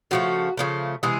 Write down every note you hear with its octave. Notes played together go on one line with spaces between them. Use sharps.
C#3 F3 A3 F#4
C#3 F3 A3
C3 E3 G#3 G#4